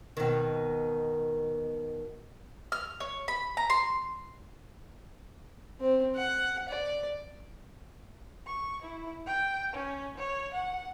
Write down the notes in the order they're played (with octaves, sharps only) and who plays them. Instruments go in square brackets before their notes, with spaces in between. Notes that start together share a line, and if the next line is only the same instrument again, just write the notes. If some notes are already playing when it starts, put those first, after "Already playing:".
[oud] B2 D#3
[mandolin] F6
C#5
B5
A#5
C6
[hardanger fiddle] C4
F#5
D5
[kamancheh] C#6
E4
G5
C#4
C#5
F#5